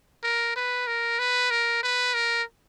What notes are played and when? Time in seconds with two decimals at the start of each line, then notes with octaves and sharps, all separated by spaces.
0.23 A#4
0.56 B4
0.87 A#4
1.19 B4
1.51 A#4
1.83 B4
2.15 A#4